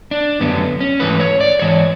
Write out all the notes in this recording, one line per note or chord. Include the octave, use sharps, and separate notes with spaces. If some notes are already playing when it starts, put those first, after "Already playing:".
D4
F#2 D3 A3 B3
C#4
G#2 E3 A3 B4
C#5
D5
G#2 E3 C#5